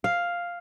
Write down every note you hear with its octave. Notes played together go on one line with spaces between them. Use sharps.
F5